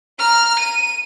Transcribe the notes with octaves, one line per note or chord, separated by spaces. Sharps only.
A#5 F6
D#7